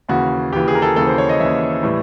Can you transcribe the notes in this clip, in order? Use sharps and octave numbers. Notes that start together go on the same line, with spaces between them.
D#2 C#3 E3 F#4
D#2 C#3 E3 G4
G#4
A#4
A4
D#2 C#3 E3 A4
C5
C#5
D#5
D#2 C#3 E3 E5
A2 E3 G3